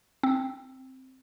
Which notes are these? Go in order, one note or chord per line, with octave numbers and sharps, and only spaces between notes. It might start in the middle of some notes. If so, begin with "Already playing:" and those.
C4